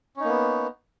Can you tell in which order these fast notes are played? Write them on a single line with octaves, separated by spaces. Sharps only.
C#4 D#4 A#3 B3